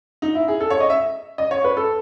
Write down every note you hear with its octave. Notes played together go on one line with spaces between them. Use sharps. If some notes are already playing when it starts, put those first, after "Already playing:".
D#4
E4
G#4
A4
C#5
D#5
E5
D#5
C#5
B4
A4